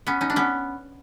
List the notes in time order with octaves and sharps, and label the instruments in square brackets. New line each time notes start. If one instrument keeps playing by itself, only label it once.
[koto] B3 C#4
C#4 D#4
D4
B3 C#4